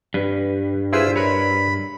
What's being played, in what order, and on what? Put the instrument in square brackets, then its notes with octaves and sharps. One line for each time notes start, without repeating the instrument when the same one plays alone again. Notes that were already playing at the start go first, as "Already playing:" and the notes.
[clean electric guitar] G2 [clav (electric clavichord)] B4
[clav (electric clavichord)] E4 G#4 B4 [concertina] F4 C5 E6
[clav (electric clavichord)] A#4 B4 C#5 [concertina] B5